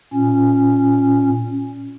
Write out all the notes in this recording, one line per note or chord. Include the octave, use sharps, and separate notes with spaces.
A#2 C#4